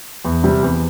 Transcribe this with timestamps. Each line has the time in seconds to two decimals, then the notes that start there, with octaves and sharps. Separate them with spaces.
0.25 E2
0.44 C3 G3
0.63 E2